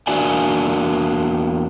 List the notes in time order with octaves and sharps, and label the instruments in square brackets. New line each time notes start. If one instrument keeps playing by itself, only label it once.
[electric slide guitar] E2 A#3 D4 F#4 D5 G#5